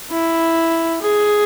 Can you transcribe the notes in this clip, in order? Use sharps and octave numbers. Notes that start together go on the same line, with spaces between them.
E4
G#4